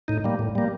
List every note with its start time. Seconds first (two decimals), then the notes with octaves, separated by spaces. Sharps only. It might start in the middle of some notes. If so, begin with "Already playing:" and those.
0.08 A2 D#4
0.24 G3 A#3
0.39 A2
0.55 G3 A#3